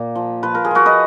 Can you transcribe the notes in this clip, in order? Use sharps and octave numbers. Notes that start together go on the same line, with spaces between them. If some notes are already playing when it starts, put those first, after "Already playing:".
Already playing: A#2 A#3
F3
F3 B4
A#4
G#4
F3 F#4 A#4
B4 D#5